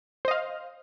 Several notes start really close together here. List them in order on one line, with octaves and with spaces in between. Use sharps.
C5 D#5 F5